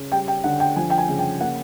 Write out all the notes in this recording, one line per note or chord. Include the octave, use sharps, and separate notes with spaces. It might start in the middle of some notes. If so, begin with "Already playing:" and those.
Already playing: C#3
G3 G5
G5
D3 F#5
G5
F3 G#5
G5
G#5
C#3
G5
A#3 F#5